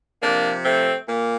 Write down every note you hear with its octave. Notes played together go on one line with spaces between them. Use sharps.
C3 F3 A#3 D4
A3 C4
A#2 A#3